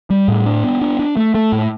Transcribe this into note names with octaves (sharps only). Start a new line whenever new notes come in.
G3
A2
D4
B3
D4
D4
A3
A3
A2